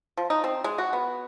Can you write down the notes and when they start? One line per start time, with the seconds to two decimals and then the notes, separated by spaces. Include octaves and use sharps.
0.17 F3
0.30 D#4
0.44 C4
0.64 G#3
0.78 F#4
0.93 B3